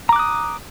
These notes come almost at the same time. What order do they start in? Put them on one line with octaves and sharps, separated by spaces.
A#5 D6 F#6 D#6